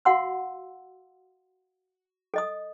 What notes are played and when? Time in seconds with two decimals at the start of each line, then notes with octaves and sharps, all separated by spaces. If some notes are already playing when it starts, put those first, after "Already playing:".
0.05 F#4 F5 F#5 C6 E6
2.34 A4 D#5 D#6